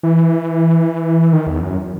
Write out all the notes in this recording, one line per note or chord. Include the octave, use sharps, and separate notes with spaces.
E3
D#3
E2
F#2